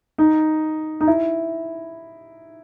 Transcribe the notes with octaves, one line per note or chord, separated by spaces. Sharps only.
D#4
D#4
E4